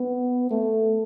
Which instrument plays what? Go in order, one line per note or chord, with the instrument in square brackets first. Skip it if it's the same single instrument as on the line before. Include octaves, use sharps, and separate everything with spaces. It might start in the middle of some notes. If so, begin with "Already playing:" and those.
Already playing: [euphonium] B3
A3